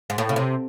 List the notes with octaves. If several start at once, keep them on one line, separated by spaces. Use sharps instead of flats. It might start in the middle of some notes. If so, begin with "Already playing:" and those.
G#2
A2
C#3
C3